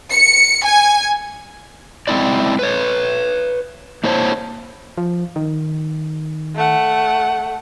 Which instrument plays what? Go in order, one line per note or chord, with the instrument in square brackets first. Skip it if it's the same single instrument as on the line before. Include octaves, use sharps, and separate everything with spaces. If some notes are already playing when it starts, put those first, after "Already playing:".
[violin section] C#7
G#5
[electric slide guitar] G#3 C4 E4 D5
B4 C#5
A#3 E4 C5 C#5 A5
[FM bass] F3
D#3
[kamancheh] A3 F#5